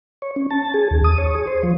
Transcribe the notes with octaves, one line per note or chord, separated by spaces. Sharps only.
C#5
C#4
A5
G#4
D#2
D#6
C#5
G#4
C5
F3